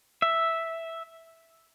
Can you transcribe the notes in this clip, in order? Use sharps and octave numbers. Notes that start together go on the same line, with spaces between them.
E5